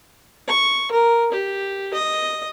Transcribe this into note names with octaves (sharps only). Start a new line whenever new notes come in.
C#6
A#4
G4
D#5